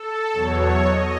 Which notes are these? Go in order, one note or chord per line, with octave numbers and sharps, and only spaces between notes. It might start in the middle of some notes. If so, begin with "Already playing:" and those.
Already playing: A4
E2 B2 F#3 C#5
D#5